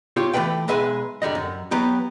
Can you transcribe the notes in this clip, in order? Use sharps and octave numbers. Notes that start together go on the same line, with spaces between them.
F4 G4 C#5
E3 F3 A3 B4 G5
B1 G#3 B4 E5 F#5 G#5
F#2 D3 G3 D#5
F#2
F#3 B3 G4